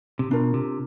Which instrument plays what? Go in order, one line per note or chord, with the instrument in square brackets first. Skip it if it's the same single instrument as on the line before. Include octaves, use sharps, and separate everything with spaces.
[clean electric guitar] C3
[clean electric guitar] B2 [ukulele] D4 F4 A#4
[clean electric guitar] C3